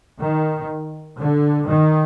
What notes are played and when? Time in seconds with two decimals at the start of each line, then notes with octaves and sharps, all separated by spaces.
0.21 D#3
1.19 D3
1.69 D#3